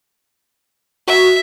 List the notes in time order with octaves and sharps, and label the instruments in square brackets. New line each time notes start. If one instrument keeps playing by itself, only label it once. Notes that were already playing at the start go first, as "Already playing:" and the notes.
[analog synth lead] F#4 [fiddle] E5